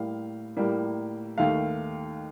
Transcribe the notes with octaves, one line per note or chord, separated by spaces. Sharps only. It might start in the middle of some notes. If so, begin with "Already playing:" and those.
Already playing: A2 G3 A#3 F5
A2 G3 A#3
D#2 D#3 A3 F5